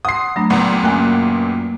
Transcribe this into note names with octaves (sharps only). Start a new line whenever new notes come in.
F#5 C6 D#6 C7
F#3 A3 D4 A#5 B5 A#6
C#2 A#2 B3
F#2 A#3 G5 G#5 F#6